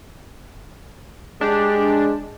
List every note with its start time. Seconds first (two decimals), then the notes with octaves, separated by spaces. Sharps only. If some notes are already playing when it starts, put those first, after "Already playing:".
1.41 G#3 D4 G4